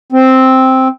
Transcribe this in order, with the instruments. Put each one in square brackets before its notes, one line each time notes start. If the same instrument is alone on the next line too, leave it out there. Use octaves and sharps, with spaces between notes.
[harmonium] C4